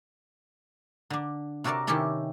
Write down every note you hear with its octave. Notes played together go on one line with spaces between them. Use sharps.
D3 D4
C3 F#4 A4 A#4 D5 A5
C3 D#3 C#4 E4 G4 A4